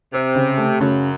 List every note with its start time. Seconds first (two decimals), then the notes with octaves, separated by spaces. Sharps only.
0.13 C3 C4
0.35 C#3
0.58 A3
0.80 F#2 C#3 F#3